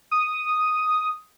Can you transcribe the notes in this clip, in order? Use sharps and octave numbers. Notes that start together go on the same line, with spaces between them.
D#6